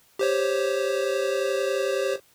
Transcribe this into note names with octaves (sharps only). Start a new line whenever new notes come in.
G4 C5 C#5